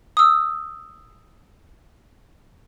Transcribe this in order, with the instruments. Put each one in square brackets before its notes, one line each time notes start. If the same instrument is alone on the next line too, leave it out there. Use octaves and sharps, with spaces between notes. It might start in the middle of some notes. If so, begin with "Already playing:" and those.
[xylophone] D#6 E6